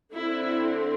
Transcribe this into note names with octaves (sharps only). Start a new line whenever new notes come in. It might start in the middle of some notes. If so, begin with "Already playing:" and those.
D3 C4 E4